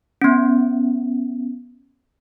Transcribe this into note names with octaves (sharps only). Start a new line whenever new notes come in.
B3 C#4